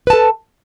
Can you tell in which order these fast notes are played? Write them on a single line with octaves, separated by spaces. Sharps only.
B4 A5 A4